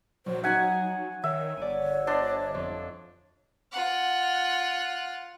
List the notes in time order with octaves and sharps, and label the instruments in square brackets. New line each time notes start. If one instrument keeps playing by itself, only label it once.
[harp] A#1 [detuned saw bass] F#3 [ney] C5
[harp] C#4 B6 [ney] D#4 [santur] F#5 G#5
[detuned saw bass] D#3 [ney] C#5 [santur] E5
[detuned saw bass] G1 [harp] D5 D#7
[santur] D4 [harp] C5 D#5 F#6
[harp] F2
[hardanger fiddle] F4 F#5